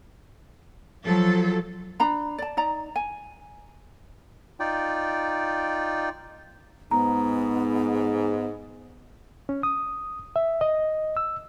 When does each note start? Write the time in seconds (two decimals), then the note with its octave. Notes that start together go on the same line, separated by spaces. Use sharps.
1.04 F3 F#3 A4
2.00 D4 A#5 B5
2.38 D5 A5
2.57 D#4 D5 A#5
2.96 G#5
4.60 D#4 F4 D5 G5
6.91 G#2 B3 A#5
9.49 C#4
9.63 D#6
10.36 E5
10.61 D#5
11.17 E6